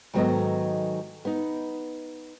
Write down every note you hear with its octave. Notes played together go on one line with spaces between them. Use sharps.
G#2 D#3 F#3 B3 A4 D#5
B3 D#4